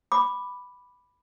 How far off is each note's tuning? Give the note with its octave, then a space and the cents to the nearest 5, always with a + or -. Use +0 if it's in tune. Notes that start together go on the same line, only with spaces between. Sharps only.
B5 +0 D6 +10